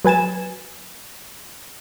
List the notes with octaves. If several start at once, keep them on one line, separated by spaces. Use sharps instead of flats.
F#3 B4 G#5 A6 E7